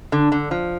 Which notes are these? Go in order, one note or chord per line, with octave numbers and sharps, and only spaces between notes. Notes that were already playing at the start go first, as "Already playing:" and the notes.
D3
D3
F3